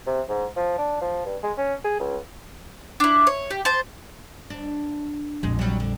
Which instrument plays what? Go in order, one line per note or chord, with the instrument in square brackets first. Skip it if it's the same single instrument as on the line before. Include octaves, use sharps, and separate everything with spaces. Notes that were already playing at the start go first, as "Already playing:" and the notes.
[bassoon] C3
G#2
F3
D4
F3
G2
G#3
C#4
G#4
C#2
[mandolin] D4 E4
C#5
G4
C5 A5
[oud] D4
[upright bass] A#1 F2 [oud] G#3
[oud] F#3 G3
D3